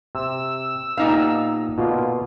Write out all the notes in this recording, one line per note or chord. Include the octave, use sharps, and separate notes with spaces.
C3 E6
A#2 B3 D4 D#4 G4 F5
B2 D3 A#3 F4